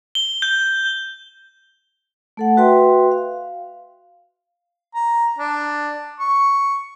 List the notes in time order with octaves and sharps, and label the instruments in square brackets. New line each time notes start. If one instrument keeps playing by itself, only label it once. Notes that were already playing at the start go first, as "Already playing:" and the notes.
[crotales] G7
G6
[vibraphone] A3 A4 F#5
F#4 B4 E5 G5 C6
F5
[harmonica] A#5
D4
C#6